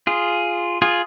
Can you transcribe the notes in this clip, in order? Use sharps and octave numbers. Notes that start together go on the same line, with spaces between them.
F4 G#4
F4 G#4